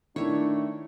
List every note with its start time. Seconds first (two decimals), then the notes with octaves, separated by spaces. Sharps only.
0.16 D#3 A3 D4 E4 C#5